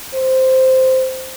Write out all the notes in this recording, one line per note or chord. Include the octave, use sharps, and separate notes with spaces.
C5